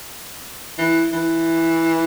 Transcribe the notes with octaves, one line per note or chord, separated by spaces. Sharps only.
E3
E3